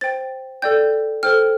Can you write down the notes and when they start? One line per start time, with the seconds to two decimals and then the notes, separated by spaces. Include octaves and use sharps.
0.01 C5 G5 A6
0.62 A4 D5 G5 G6
1.23 A4 C5 G5 F6